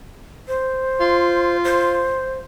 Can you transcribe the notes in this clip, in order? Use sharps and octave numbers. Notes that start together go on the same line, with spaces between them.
C5
F4
C5